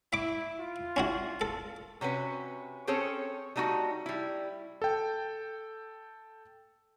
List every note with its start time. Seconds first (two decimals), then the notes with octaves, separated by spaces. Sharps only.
0.13 E4 E5 D6
0.60 F4
0.96 C#4 E4 F#4
1.41 A4
2.01 C3 C#4 F#4 B4
2.87 C4 C#4 G#4 A4 C5 C#5
3.56 G3 A3 D#4 F4 F#4
4.06 G3 E4
4.82 A4 G5